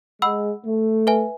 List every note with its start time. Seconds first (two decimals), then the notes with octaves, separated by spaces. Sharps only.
0.22 G#3 F#5 B5 E6
0.65 A3
1.07 B4 E5 G#5